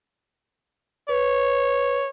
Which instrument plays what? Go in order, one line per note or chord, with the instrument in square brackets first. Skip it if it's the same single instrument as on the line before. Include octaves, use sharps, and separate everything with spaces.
[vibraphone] B4 [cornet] C#5